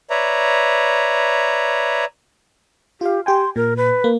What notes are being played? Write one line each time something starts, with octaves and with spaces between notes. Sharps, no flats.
B4 C#5 D5 E5 A#5
F4 G4 F5
G4 G5 G#5 C6
A#2 A#4
B4
A#3